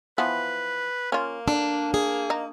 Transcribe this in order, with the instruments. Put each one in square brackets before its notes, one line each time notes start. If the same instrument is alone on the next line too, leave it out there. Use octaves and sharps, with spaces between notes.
[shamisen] E3 F3 B3 [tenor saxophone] B4
[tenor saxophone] A#3 [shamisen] C#4 F4
[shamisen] D3 [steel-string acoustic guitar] D4
[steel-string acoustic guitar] G#4
[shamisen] D#4